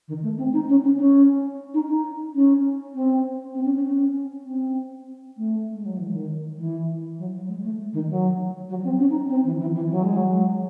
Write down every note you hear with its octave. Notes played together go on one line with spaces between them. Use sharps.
D#3
A3
C4
D#4
C#4
C#4
C#4
D#4
D#4
C#4
C4
C4
C#4
C#4
C#4
C4
A3
G#3
F#3
E3
D#3
E3
F#3
F#3
G#3
A3
D#3
F#3
F#3
C4
C#4
D#4
C4
E3
E3
E3
F#3
G#3
F#3